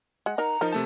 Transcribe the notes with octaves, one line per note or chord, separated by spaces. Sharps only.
G#3 F#5
D#4 A#4 A#5
F3 D#4 A#4
C3 A3 A5